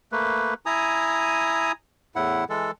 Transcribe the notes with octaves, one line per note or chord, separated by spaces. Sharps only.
A3 A#3 B4
E4 G#5 A#5 D#6
E2 A2 E4 F#5
E3 G#3 A4